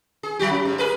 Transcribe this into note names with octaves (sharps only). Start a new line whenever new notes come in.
G#4
F#3 F#4 G4
C#4
G#2
G#4 A#4 B4